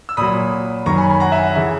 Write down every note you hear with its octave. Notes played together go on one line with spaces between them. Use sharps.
E6
A#2 F#3 B5 D#6
F#2 D#3 F#3 A#5 C#6
G#5 B5
G#5 B5
F#5 A#5
E5 G#5
F#5
C#3 E3 E5